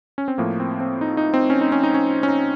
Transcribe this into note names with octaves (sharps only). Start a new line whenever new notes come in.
C#4
C4
A2 F3 A#3
C4
C4
D#4
D#4
C4
C#4
D#4
C#4
D#4
C#4
C#4
D#4